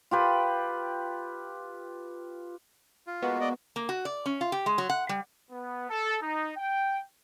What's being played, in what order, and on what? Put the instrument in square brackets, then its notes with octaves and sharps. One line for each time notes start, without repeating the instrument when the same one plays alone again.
[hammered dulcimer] F4 G4 B4
[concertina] F4
[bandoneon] G#3 A#3 F#4 [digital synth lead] B3
[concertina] D5 D#5
[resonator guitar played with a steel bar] A#3
F#4
D5
C#4
F4
G4
G#3
F#3
F#5
G3
[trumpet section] B3
A4
D#4
G5